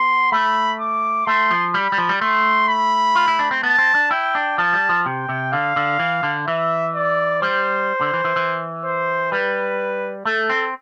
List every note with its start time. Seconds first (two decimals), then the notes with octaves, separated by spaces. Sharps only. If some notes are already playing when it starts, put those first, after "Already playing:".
Already playing: B3 C6
0.31 A3 B5
0.80 D6
1.26 A3 C6
1.51 F3
1.74 G3 B5
1.92 G3
1.98 F3
2.09 G3
2.21 A3 C6
2.68 B5
3.15 F4
3.28 E4
3.39 D4
3.51 C4
3.63 B3 A5
3.78 C4
3.95 D4
4.11 E4 G5
4.35 D4
4.58 F3 A5
4.73 G3
4.89 F3
5.05 C3 G5
5.29 C3
5.52 D3 F5
5.76 D3
5.99 E3
6.23 D3
6.47 E3 E5
6.95 D5
7.41 G3 C5
8.01 D3
8.13 E3
8.25 E3
8.36 E3
8.84 C5
9.31 G3 B4
10.25 A3 A4
10.50 C4